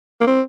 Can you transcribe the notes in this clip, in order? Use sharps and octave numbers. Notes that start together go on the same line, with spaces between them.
A#3
C4